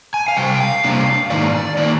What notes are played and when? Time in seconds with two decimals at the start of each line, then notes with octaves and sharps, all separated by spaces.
0.14 G#5
0.28 F5
0.37 C3 G3 G5
0.60 F5
0.84 C3 G3 A#3 D4
1.30 G#2 D#3 A#3 D#4 D5
1.77 D#3 A#3 D#4 D5